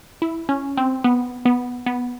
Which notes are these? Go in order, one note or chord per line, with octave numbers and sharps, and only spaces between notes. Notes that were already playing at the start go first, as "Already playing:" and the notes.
E4
C#4
C4
B3
B3
B3